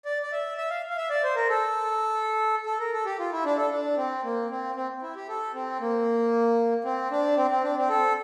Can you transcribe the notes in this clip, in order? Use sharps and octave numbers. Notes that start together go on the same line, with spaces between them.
D5
D5
E5
E5
F5
F5
E5
D5
C5
A#4
A4
A4
A#4
A4
G4
F4
E4
D4
A4
D4
C4
A#3
C4
C4
E4
G4
A4
C4
A#3
C4
D4
C4
C4
D4
C4
A4